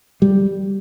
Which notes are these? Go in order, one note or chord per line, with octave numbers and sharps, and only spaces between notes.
G3